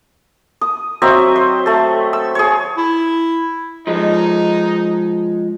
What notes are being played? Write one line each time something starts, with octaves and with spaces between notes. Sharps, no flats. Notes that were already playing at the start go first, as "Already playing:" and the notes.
D#6
F#3 C4 D#5 E5
C5
A3 A4
E6
G#4 C#5
E4
F3 G#3 D#4